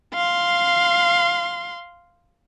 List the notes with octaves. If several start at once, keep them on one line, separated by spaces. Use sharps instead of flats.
F5 C6